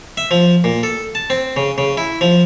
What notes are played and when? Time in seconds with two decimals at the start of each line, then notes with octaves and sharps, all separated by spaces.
0.17 E5
0.31 F3
0.64 A#2
0.83 A4
1.15 A5
1.30 C4
1.56 C#3
1.78 C#3
1.97 E4
2.21 F3